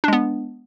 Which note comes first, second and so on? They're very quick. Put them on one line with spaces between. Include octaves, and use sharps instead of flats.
D4 G#3 B3